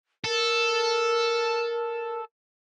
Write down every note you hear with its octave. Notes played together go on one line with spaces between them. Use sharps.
A4 A#4